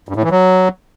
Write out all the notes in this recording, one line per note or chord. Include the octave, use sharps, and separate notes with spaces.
G2
A2
E3
F#3